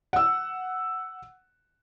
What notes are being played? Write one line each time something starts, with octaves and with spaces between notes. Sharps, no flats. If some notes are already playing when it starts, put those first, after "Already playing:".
F#5 E6